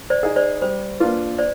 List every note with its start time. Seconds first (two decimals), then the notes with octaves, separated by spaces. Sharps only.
0.10 C5 D5
0.23 D#4 G#4
0.36 C5 D5
0.62 G3 C5
1.00 A#3 D4 F4 B4
1.38 C5 D5